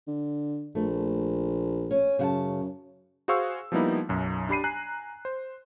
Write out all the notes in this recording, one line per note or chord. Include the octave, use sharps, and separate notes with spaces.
D3
A#1 A3
C#4
F#2 C#3 F#5 A5
F#4 G#4 C5 F5 C#6 E6
F3 G3 A#3 B3 D#4 E4
B1 F#2
D4 G4 B5 C7 D#7
G#5 A#5 F#6
C5